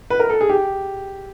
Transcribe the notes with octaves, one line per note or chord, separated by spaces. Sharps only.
B4
A#4
A4
G#4
G4